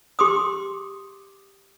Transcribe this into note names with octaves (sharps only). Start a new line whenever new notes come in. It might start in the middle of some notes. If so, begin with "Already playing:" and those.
G4 C6 D6 D#6